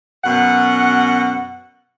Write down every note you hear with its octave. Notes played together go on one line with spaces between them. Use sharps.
F#2 B2 F#5